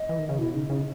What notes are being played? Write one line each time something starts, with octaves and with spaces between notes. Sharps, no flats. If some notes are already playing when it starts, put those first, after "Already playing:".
Already playing: D#5
E3
D#3
C#3
B2 E4
C#3 D#4
C#3 C#4